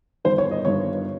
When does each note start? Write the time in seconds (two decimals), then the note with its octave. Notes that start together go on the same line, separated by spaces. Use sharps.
0.25 G1 G2 D#3 C5
0.38 C#5
0.51 D#5
0.65 G1 G2 D#3 C#5